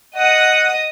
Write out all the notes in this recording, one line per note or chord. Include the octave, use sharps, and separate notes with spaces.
D#5 F#5 D#6